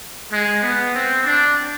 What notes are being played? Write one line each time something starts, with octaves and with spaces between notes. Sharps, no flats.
G#3
B3
C4
D4